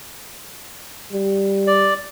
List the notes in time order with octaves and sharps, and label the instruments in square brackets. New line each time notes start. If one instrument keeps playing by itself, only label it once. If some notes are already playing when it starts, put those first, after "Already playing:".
[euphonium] G3
[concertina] D5